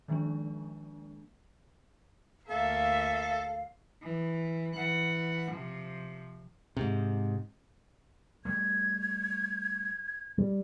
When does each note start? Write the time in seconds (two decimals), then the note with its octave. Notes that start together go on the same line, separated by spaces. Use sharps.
0.08 D#3 F3 G#3 A#3 D4
2.49 D2 A#3 A4 E5 F5
4.03 E3
4.75 E3 F#5
5.51 C3 F3
6.77 G#2 C3
8.45 G3 A3 G#6
10.38 G3